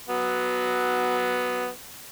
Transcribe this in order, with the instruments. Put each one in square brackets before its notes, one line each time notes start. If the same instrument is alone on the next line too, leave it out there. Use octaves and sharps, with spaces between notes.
[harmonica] F#3 B3